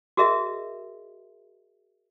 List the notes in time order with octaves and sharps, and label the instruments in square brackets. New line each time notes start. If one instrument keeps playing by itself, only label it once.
[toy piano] F#4 G#4 A#4 D#5 E5